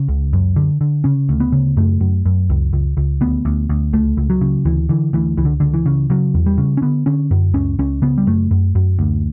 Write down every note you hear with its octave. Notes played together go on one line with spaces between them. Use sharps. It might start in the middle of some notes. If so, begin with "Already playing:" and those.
Already playing: C#3
C#2
F#2
D3
D3
C#3 C#4
D2
B3
C#3
F#2 A3
F#2
F#2
C#2
C#2
C#2
D2 B3
D2
D2
C#2 A3
C#2
F#3
C#3
D2 E3
D3 E3
D2 E3
C#2 E3
D3
C#2 D3
E3
C#3
C#3 F#3
E2
G3
C#3
C#4
D3 B3
D3 C#4
F#2
C#2 C#4
C#2 C#4
C#3 B3
G3
F#2 A3
F#2
F#2
D2